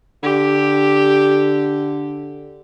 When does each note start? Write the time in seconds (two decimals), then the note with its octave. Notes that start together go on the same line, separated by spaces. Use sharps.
0.23 D3 G4